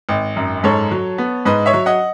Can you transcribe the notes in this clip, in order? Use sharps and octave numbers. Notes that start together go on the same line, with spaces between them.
G#1
F#2
G#2 A4 C#5
F#3
B3
G#2 B4 D#5
C#5 E5
F#3
D#5 F#5